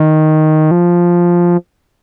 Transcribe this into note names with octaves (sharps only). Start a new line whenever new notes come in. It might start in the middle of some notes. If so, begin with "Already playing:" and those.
Already playing: D#3
F3